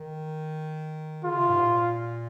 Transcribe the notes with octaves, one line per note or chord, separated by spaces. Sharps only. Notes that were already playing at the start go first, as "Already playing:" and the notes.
Already playing: D#3
C#3 F4
C3
G#2
A#2